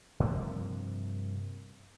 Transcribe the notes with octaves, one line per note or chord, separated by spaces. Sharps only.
G2 C3 F3 A#3